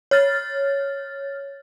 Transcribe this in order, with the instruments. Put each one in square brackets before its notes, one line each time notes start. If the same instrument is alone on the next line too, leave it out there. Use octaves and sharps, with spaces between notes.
[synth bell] C#5 F6 A6